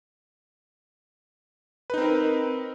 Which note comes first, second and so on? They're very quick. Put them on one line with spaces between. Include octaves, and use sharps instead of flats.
B4 D#4 C4 A#4